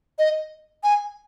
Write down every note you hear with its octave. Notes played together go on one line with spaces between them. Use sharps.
D#5
G#5